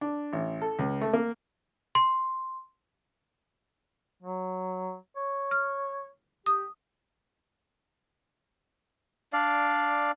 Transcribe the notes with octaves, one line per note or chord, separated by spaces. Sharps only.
D4
A1
A4
C#2
A3
A#3
C6
F#3
C#5
F6
G4 D#6
D4 D5 F5